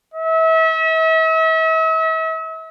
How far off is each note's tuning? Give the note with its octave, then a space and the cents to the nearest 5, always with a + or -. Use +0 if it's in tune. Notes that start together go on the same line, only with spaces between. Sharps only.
E5 -40